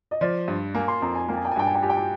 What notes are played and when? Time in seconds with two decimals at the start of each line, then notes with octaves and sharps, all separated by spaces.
0.11 D#5
0.21 F3 D5
0.48 G2
0.75 A#3 G#5
0.88 C6
1.02 F2 A#5
1.15 G#5
1.29 A#3 G5
1.37 G#5
1.45 G5
1.51 G#5
1.56 G2 G5
1.67 G#5
1.75 G5
1.83 G4 G#5
1.90 G5
1.97 G#5